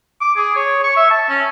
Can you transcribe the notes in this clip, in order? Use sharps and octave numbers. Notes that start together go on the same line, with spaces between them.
D6
G#4
C#5
C#6
E5
A5
C#4